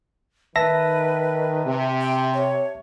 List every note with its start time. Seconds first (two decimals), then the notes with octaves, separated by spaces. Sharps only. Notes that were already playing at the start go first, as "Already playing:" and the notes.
0.56 D#3 B4 E5 A5 A#6
1.64 C3
2.01 G5
2.34 C#5